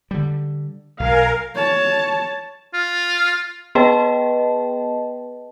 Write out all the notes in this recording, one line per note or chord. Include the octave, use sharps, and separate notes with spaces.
D3 G3
B1 A#4 F5 G#5
C#5 A5
F4
B3 G#4 B4 D#5 G5 A5